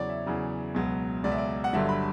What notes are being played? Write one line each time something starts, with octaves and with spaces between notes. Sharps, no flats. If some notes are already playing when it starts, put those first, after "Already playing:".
Already playing: E2 C#3 F#3 C#5 D5
E5
E2 C#3 F#3
C#2 B2 F#3
C#2 B2 F#3 D5
E5
D5
F#5
G1 G2 D3 F#3 E5
B5